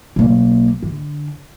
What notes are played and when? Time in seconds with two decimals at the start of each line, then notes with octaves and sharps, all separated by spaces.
0.16 B1 A#3
0.83 D3